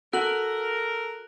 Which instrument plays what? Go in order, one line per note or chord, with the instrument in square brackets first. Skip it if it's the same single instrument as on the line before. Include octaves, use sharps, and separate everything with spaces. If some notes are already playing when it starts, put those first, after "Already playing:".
[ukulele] F#4 [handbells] A4 [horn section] A#4 [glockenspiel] F#6 F#7